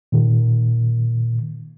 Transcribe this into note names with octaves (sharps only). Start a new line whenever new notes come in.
A#2 D#3